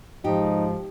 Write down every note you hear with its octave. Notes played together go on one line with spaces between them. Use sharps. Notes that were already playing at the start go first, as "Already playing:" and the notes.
G#2 F3 D#4 G4